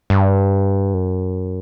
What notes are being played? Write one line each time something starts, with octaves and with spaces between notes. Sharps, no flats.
G2
F#2